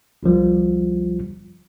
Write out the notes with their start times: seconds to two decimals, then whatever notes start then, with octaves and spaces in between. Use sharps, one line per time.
0.23 G1 C2 F3 G3